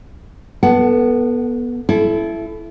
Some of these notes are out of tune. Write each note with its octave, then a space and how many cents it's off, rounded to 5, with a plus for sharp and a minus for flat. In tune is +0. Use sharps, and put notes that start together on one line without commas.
B3 -20 A4 +0 F#5 +20
E4 +15 A4 -30